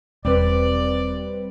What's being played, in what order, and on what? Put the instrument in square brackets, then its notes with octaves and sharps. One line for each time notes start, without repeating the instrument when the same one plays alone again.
[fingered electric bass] E1 [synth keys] G3 C4 B4 [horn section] D5